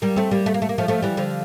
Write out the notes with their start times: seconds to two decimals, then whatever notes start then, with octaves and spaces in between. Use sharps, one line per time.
0.02 G3 A#3
0.16 A3 C4
0.31 G3 A#3
0.46 A3
0.54 A#3
0.62 A3
0.69 A#3
0.78 F3 A3
0.88 F3 A3
1.02 E3 G3
1.17 D3 F3